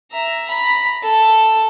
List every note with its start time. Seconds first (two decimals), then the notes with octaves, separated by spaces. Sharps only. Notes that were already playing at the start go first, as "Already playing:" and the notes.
0.12 E5 A#5
0.49 A#5 B5
1.03 A4